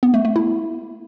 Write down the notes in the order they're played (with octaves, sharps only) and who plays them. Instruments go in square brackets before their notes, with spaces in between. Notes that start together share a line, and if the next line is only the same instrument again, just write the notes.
[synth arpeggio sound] B3
A3
A3
E4